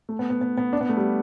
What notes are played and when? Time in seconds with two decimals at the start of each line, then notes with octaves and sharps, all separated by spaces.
0.09 A3
0.19 B3
0.30 B3
0.41 B3
0.57 B3
0.73 D4
0.81 B3
0.89 A3
0.97 G3